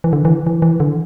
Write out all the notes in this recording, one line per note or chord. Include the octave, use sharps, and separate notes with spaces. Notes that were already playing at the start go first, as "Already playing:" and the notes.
E3
D3
E3
E3
E3
D3